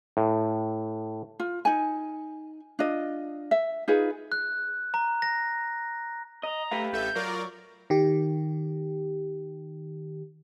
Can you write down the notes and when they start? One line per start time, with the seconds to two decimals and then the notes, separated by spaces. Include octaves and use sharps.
0.17 A2
1.40 F4
1.65 D#4 G#5
2.79 D4 F4 D#5
3.51 E5
3.88 D#4 F4 G#4 B4
4.32 F#6
4.94 A#5
5.22 A#6
6.43 D#5 A#5
6.71 A3 G4 B4 F5
6.93 A1 A4 E5 G6
7.15 F#3 F4 A#4 D5
7.34 C#6
7.90 D#3 G4